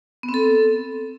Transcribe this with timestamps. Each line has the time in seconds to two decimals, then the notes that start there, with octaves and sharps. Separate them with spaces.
0.23 B3
0.29 C4
0.34 A4